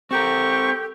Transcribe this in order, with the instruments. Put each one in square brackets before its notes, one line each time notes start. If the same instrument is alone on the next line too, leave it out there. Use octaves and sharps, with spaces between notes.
[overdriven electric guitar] C4 A#4 [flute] G4 [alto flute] A4 [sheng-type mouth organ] C#6